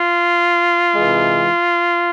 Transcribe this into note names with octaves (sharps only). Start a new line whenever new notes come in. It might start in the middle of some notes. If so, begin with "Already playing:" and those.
Already playing: F4
C3 E3 G#3